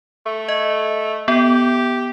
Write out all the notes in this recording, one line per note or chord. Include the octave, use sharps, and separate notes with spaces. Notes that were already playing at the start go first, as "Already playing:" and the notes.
A3
D#5
B3 G4